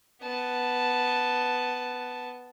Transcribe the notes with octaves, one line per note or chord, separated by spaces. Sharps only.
B3 A5